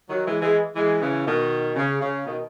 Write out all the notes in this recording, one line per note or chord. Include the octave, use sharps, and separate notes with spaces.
D#3 F#3
E3 G#3
E3 G#3
E3 G#3
C#3 E3
B2 D#3
C#3
C#3
B2 D#3